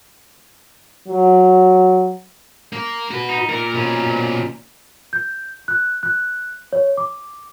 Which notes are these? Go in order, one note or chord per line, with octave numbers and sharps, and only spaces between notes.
F#3
A#3
F#4 B4
D#4
A#2 A#4
B2 C#4
G6
F#6
F#6
C#5
D6